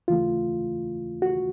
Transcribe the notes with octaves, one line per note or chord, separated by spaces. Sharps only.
D#2 C#3 E3 A3 F4
F#4